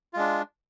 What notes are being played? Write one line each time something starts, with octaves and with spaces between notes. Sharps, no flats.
G#3 D4 F4